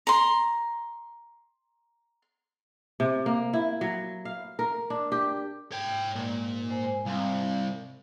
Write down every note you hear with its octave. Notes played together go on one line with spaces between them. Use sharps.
A#5 C6
C3
A#3
E4
F#3
F5
A#4
D4
G4
G#2 C#5 G5
A#2
C5 G#5
C2 C4 F5